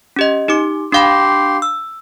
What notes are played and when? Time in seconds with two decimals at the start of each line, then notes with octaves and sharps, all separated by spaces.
0.16 C#4 G4 D#5
0.48 D#4 G4 D6
0.92 D4 G4 F5 B5 C6
1.62 E6